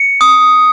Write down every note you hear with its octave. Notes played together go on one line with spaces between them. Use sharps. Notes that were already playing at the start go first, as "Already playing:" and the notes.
Already playing: C#7
D#6